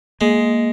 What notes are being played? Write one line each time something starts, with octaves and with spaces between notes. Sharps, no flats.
G#3 A#3